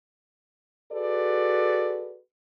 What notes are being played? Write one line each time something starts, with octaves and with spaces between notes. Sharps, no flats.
F#4 G#4 A4 B4 D5